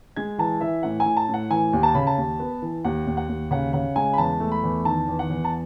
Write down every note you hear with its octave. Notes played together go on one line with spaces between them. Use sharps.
G#3 G#6
E3 A5
E3 E5
A2 F#5
G#5
A2
A5
A2
F#5
E3 G#5
D#2
A5
C#3 B5
A5
D#2
B3
E3
D#2 F#5
D#2
F#5
D#2
C#3 F#5
C#3 F#5
G#3 G#5
B5
E2 A5
A3
B5
E2
D#3 A5
E2
F#5
E2
A5